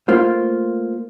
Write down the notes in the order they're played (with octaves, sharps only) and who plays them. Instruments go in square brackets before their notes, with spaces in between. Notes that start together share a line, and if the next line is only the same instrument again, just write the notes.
[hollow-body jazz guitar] A3 A#3 F4 C5